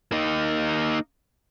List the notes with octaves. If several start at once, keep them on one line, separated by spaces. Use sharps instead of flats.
A#3 D#4